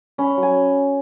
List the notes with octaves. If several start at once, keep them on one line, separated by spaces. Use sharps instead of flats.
C#4 B5
F#3
G#5